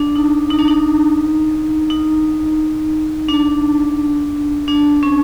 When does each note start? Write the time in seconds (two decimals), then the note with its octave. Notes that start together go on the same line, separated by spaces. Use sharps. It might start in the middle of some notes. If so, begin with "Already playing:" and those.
Already playing: D4
0.16 D#4
0.50 D#4
0.59 D4
0.68 D#4
1.90 D#4
3.29 D4
4.68 D4
5.03 C#4